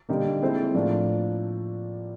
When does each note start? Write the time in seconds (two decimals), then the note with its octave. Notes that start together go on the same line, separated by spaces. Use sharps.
0.09 D3 G3 A#3 D#4
0.42 G#3 C4 E4 A4 C5
0.74 A2 F3 A#3 D4